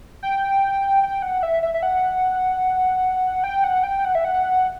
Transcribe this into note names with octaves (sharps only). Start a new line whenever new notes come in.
G5
G5
F#5
E5
E5
E5
F#5
G5
F#5
G5
F#5
E5
F#5